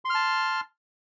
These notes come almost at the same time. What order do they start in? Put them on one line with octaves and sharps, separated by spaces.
C6 F6 A5